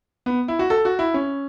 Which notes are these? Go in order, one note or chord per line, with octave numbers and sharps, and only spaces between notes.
B3
E4
F#4
A4
F#4
E4
C#4